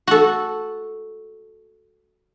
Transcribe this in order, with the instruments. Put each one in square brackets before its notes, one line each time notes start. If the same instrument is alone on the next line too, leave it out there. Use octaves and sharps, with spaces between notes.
[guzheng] F#4 A4